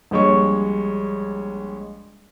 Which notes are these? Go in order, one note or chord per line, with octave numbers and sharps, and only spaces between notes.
A#1 G3 G#3 C#5 C#6